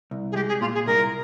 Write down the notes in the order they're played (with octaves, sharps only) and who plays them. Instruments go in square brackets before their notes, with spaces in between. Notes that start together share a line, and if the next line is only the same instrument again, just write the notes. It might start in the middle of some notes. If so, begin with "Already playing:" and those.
[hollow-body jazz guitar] C2
[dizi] G#4
[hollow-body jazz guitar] G#3 [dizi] G4
[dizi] G#4
[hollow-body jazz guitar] A#2 [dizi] F4
[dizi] G#4
[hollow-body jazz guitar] C2 [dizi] A#4